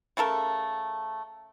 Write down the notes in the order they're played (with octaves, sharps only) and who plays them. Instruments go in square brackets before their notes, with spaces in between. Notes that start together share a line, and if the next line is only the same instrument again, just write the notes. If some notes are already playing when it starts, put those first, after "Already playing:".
[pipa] C#3 A3 A4 A#4